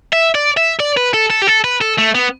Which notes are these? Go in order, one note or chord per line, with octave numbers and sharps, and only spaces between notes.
E5
D5
E5
D5
B4
A4
A4
G4
A4
B4
A4
A3
B3